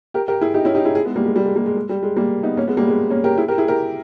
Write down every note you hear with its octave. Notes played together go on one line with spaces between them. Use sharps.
G4 A#4
G4 A#4
E4 G#4
D#4 G4
C#4 E4
D#4 G4
E4 G#4
E4 G#4
G#3 B3
G3 A#3
G#3
G3
G#3
G3 A#3
G#3
G#3
G3
G#3
G3 A#3
B3 D#4
A#3 C#4
G#3 B3
G3 A#3
G#3 B3
A#3 C#4
G4 A#4
E4 G#4
G4 A#4
E4 G#4
G4 A#4